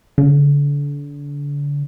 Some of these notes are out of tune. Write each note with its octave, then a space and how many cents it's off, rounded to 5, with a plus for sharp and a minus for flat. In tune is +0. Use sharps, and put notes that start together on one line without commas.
D3 -35